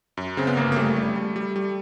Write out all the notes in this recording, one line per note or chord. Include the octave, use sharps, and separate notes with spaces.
F#2
C#3 C4
B3
G1 A#3
A#3
G3 A3
G3
G3
G3
G3